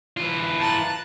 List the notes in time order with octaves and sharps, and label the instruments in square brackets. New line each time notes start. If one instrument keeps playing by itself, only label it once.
[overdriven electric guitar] E3 F4
[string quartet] A5 A#5 F#6